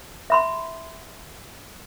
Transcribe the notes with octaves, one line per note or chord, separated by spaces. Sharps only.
E5 B5 C6